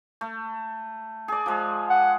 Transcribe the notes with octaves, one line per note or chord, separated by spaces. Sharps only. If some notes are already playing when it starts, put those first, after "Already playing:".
A3
G#4 D5
F3 G#3 G#4
F#5